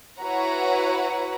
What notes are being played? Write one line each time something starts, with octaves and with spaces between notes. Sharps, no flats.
E4 F#4 B4 C#5 F#5 A#5